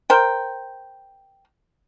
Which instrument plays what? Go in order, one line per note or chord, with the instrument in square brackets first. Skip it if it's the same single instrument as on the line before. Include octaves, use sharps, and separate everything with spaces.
[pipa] A#4 C5 G5